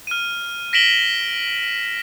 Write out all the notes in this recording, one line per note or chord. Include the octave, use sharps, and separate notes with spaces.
F6 D#7
A#6 B6 D7 E7 F#7 G7